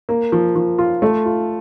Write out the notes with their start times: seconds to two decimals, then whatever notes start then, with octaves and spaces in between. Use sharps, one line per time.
0.09 A#3
0.32 F3
0.56 F3
0.78 F4
1.02 A3
1.26 F4